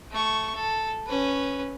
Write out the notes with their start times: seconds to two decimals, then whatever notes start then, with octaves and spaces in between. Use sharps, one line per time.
0.11 A3 C#6
0.55 A4
1.07 C#4 B4